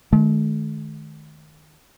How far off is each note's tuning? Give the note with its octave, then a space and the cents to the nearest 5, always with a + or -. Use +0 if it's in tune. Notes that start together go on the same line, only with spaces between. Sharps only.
D#3 -20 A3 -45